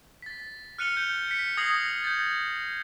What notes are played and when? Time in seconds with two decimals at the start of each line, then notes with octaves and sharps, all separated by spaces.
0.22 A6 B6
0.78 F6 F#6 C#7 D#7 F7 G7
0.97 G6
1.29 B6 C#7
1.57 D#6 G#6 A#6 C7 F7 F#7
2.04 G6 A6